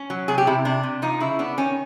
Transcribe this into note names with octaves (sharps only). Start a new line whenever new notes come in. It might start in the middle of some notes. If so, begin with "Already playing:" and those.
Already playing: C#4
F#3
C3 G#4
G4
C3 E4
C3 D4
C3
F3 D#4
C#3 E4
B3 D4
D#3 C#4